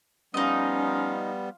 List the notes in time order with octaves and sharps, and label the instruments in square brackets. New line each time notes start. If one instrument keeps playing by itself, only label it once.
[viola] F3 F5 [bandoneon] G3 B3 [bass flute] C#4 [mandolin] D#4 D#5